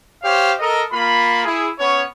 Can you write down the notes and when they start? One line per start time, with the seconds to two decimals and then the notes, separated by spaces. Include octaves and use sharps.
0.23 G4 C5 C#5 F5
0.60 A4 A#4 D#5
0.92 A#3 F4 B5
1.44 E4 G#4
1.79 B3 C#4 C#5